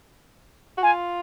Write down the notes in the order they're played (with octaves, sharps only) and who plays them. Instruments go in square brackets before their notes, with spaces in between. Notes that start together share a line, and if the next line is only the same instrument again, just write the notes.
[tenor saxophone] F#4
[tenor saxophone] F4 [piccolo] G#5